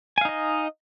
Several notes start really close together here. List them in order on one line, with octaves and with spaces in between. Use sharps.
G#5 F5 D#4 D#5